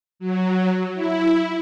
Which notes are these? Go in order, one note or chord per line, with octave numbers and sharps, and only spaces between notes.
F#3
E4